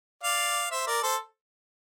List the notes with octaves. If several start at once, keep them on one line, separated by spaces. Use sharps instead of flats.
D5 F5
C5 E5
A#4 D5
A4 C5